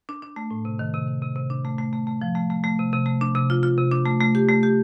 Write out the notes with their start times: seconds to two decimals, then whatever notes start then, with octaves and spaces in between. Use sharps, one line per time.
0.09 D4
0.22 D4
0.36 A3
0.51 A2
0.65 C3
0.79 D#3
0.94 C3
1.07 D#3
1.22 C3
1.36 C3
1.50 D4
1.65 A3
1.79 A3
1.93 A3
2.07 A3
2.21 F3
2.35 A3
2.50 A3
2.64 A3
2.79 C3
2.93 C3
3.06 A3
3.21 D4
3.35 C3
3.50 F4
3.63 F4
3.78 C3
3.91 D4
4.06 A3
4.21 A3
4.35 G4
4.49 A3
4.63 G4